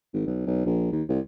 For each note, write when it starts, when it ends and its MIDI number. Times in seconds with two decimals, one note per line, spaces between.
0.13 0.25 32
0.27 0.43 35
0.46 0.62 35
0.66 0.91 34
0.92 1.02 39
1.09 1.19 36